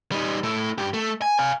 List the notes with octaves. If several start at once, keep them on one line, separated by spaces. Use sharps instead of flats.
G3 D#4
A3 E4
G2 G4
A3
G#5
F5 G#5